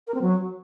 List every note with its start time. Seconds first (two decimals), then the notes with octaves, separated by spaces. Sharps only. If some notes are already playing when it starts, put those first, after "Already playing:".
0.07 A#4
0.14 C4
0.21 F#3